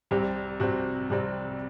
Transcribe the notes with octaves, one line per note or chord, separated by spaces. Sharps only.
C2 C3 G3 C4 G4
C2 C3 G3 C4 F#4
C2 C3 G3 C4